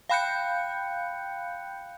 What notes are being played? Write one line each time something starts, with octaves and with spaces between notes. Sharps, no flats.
F5 G5 B5 F#6 G6 C#7